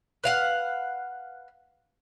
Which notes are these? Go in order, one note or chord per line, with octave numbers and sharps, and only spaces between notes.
B4 F5 F#5